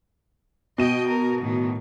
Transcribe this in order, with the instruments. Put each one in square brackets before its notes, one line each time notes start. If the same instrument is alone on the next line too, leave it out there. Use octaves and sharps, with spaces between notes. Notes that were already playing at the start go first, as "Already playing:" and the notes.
[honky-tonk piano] B2 D#7 [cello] D#5 G5
[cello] A#4
A2 D#3